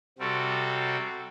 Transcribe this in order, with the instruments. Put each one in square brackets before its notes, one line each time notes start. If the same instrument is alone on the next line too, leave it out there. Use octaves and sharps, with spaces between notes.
[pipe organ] C3 G3 C4 F#4 A4